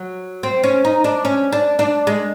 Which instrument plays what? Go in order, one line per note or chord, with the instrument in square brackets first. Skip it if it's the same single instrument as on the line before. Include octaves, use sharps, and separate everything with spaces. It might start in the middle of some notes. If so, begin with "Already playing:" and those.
Already playing: [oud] F#3
C4
C#4
D#4
D4
C#4
D4
D4
G#3